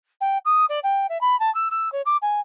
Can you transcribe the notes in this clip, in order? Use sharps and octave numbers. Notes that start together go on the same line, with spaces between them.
G5
D#6
D5
G5
E5
B5
A5
E6
E6
C#5
D6
G#5